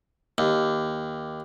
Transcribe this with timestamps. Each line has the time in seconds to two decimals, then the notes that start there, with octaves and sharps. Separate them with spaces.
0.38 D#2